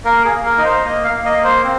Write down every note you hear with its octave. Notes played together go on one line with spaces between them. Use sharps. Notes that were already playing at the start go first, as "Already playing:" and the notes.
A#3 A#4
G#4
A#3
A#4
D#4 D#5
C5
A#3 D#5
F5
A#3
D#5
A#3
C5
C4